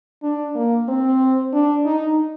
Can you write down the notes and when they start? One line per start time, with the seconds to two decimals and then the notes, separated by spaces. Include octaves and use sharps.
0.23 D4
0.55 A#3
0.88 C4
1.53 D4
1.85 D#4